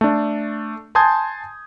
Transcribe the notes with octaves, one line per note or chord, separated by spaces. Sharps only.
A3 D4
G#5 A5 C6 D#6 G6 G#6